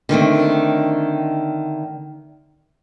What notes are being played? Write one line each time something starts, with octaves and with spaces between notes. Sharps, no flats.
D3 D#3 A3 C4